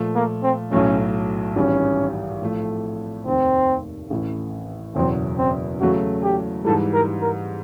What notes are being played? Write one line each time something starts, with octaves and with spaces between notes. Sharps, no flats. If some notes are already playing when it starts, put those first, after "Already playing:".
Already playing: A#2 F3 A3
A#3
C4
B1 A2 F#3 A3 C#4
G#1 G#2 E3 G3 C#4
A2 F3 A3
F1 D#2 D#3 C4
A1 A2 E3
F#1 E2 B2 F#3 C4
C4
E2 C#3 F#3 A3 F#4
G4
G#2 E3 G3 A4
A#4
A#4